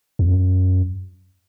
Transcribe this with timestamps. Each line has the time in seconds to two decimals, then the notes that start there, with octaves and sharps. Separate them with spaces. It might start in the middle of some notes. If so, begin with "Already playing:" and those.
0.19 E2
0.26 F#2